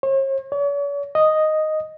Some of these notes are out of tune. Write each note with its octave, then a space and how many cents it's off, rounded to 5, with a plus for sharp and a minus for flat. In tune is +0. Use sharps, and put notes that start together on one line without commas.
C#5 -45
C#5 +45
D#5 +0